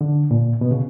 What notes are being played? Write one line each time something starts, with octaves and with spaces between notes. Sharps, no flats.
D3
A#2
B2
C#3